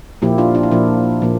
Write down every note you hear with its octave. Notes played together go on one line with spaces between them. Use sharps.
A#2 F3 A#3 E4 G4
D4 F4
D4 F4
E4
A#2 F3 A#3 D4
A#2 F3 A#3